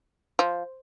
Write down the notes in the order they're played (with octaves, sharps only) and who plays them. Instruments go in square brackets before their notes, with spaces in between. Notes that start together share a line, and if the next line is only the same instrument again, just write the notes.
[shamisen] F3